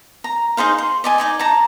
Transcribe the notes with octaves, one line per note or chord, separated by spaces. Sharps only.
A#5
D#4 G#4 C5 F5
C6
D5 D#5 G#5
D#4 D5 G#5
A5 A#5